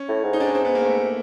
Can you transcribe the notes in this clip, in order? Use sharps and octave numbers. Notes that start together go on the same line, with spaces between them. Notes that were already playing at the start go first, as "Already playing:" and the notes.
Already playing: C#4
A2
G#2
D#4
G#2 D4
C#4
C4
B3
A#3
A3